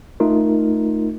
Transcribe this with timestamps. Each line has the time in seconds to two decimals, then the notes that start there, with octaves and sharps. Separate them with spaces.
0.20 A3 D#4 F4 A#4